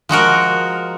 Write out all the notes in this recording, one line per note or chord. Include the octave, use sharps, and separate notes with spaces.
F3 G#3 F#4 A#4